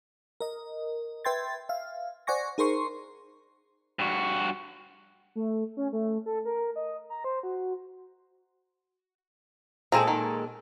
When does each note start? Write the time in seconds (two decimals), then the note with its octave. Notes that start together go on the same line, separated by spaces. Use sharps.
0.40 A#4 D#5
1.25 B4 E5 G5 C6 G#6 A6
1.69 E5 F5
2.27 C5 D5 F#5 G#5 C#6 A#6
2.58 D#4 G#4 A#4 C5 C6 C#6
3.99 G2 F#4
5.35 A3
5.77 C#4
5.93 A3
6.26 A4
6.45 A#4
6.76 D#5
7.10 A#5
7.24 C5
7.43 F#4
9.92 A#2 G#3 C4 G#4 A4 A#5
10.07 D#3